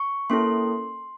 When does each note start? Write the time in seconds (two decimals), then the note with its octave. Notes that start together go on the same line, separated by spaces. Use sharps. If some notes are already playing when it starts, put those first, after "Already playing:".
Already playing: C#6
0.30 A#3 C#4 E4 A4 C6